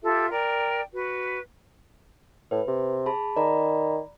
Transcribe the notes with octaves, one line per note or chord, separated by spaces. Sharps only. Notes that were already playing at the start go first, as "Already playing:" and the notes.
F4 G4 A4 E5
A#4 D5 G5
F#4 B4
A2 B4
C3
G#4 A5 B5
D#3 D5 A#5 B5